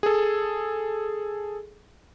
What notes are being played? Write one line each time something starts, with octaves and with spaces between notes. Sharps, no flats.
G#4 A4